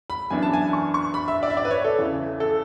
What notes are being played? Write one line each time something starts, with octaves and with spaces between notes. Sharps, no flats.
B5
F#2 E3 B3 D4 G#5
A5
G#5
C#6
C#6
B5
E5
D5
E5
D5
B4
C#5
A4
E2 C#3 E3
A4